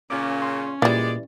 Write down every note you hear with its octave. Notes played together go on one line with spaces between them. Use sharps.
A#2 C#3 C#4 D6
C6
A#2 E3 G3 G#3 D5 A6